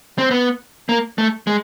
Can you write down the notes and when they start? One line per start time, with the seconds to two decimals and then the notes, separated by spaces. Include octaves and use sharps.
0.18 C4
0.31 B3
0.89 A#3
1.18 A3
1.47 G#3